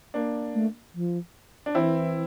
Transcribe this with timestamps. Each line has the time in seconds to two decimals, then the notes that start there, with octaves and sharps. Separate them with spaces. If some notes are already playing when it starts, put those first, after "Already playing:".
0.14 A#3 D4
0.55 A3
0.94 F3
1.66 D4
1.75 E3 C4 E4